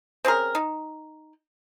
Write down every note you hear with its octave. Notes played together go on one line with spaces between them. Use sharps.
C4 C#4 G#4 A#4
D#4